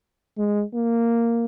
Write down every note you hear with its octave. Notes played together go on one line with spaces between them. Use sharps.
G#3
A#3